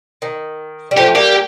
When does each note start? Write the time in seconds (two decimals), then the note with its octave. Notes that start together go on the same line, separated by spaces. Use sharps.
0.22 D#3
0.91 G3
0.97 F3 A3 G4
1.15 G3 A#3 G4